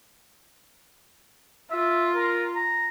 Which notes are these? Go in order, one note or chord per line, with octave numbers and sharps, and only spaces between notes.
F4 E5
A#4
A#5